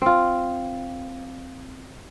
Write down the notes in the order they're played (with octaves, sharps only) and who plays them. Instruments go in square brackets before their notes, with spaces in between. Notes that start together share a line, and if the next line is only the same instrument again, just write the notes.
[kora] C4 F4